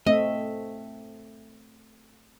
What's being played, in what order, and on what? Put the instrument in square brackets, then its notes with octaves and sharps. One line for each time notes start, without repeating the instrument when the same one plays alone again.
[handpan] A3 C4 E5 [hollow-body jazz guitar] D#5